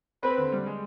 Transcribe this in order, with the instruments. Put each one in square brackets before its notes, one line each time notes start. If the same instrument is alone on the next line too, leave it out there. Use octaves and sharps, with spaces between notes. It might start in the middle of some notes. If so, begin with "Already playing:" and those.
[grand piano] C4 [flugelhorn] B4
[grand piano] D3
G3
G#3